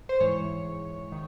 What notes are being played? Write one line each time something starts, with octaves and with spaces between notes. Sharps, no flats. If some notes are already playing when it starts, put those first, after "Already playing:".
C5
G#2 E3 C#5
D#3